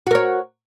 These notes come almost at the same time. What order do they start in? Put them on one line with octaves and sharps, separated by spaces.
F#4 A#4 C#5